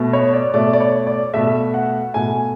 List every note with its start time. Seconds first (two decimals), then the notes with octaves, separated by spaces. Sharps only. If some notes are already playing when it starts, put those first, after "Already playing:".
Already playing: B2 A3
0.13 C#5
0.33 D5
0.53 B2 A3 D5
0.73 D5
0.80 C#5
1.07 D5
1.34 B2 A3 E5
1.74 F#5
2.14 B2 A3 G#5